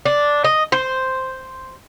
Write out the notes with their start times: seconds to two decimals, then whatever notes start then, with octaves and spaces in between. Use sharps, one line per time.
0.05 D4
0.44 D#5
0.72 C5